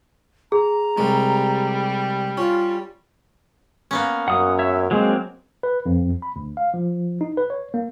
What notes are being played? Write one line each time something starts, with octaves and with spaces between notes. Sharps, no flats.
G#4 A#5
C2 G3 G#3
C#4 F4
A#3 B3 C#4
F#2 F#5 D#6
C#5 E5
F#3 G#3 A#3 C4
B4
F2
B5
D2
F5
F3
D#4
B4
C#5
A#3